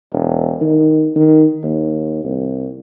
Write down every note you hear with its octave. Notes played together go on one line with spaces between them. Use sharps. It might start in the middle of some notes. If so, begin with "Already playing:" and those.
E1
D#3
D#3
D#2
C2